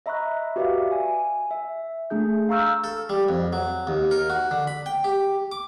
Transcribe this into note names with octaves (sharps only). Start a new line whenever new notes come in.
D#5 E5 A#5 B5 C#6 F#6
F#4 G4 B4 D5 E5 F5
G#5
E5
A3 D4 G#4 G6
F5 A#5 C#6 E6 F6 G6
A4
G3
F2
F#3
D#2
A#4
F#4
D3
B5
G5
G4
D6